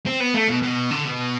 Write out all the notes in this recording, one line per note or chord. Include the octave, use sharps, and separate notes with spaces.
C4
B3
A3
B2
B2
D3
B2